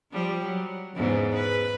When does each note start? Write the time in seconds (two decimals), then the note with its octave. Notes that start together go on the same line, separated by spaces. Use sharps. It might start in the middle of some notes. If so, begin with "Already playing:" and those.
0.12 F3 G3
0.44 F#3
0.96 E2 G#2 C#3
1.34 B4